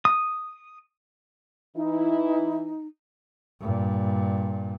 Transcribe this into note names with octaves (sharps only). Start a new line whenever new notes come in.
D#6
E3 D#4 E4
G2 A#2